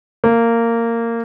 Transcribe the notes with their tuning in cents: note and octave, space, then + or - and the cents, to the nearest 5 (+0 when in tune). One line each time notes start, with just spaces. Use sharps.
A#3 -15